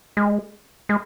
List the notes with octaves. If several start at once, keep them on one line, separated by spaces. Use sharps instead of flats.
G#3
G#3